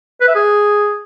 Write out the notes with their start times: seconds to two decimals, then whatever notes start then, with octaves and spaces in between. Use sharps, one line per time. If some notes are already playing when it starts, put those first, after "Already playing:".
0.21 B4
0.28 E5
0.35 G#4